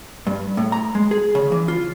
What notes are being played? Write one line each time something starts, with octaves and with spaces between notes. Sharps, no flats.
G2
A2
A#5
G#3
G#4
C#3
E3
F4